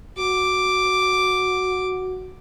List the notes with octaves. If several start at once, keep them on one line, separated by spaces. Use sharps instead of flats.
F#4 D6